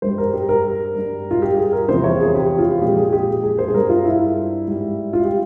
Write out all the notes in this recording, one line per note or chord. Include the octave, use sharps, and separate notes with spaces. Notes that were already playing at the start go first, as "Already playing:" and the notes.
G2 G3 C5
A#4
G4
A#4
G2 G3
F4
G4
G#4
A#4
E2 C3 F3 C5
C#5
G#4
G4
F4
A#2 F3 G#3 G4
G#4
G4
G#4
C5
G#4
G2 G3 A#4
F4
E4
G#2 G3
F4
G4